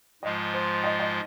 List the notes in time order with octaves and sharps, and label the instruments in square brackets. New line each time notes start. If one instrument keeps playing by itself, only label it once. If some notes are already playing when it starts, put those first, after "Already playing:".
[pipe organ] G#2 F3 G#3 F4 [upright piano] D#5
[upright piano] C5
D#5
D#5